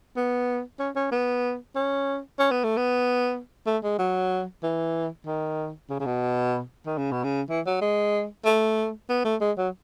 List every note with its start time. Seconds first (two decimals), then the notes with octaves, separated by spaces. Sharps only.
0.16 B3
0.79 C#4
0.96 C#4
1.12 B3
1.75 C#4
2.39 C#4
2.51 B3
2.64 A3
2.77 B3
3.66 A3
3.84 G#3
3.99 F#3
4.63 E3
5.26 D#3
5.90 C#3
6.00 C#3
6.06 B2
6.86 D#3
6.98 C#3
7.12 B2
7.24 C#3
7.50 E3
7.66 F#3
7.82 G#3
8.45 A3
9.09 B3
9.25 A3
9.41 G#3
9.58 F#3